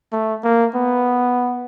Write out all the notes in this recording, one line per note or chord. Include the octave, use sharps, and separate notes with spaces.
A3
A#3
B3